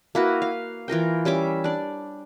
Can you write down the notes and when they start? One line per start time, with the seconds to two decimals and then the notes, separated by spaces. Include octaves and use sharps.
0.15 A#3 E4 F#4 B4
0.42 F5
0.88 E3 F4 A#4 G5
1.25 G3 C#4 E5 D6
1.64 D4 D5